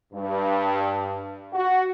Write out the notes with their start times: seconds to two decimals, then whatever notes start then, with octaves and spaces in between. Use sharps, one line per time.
0.13 G2
1.53 F#4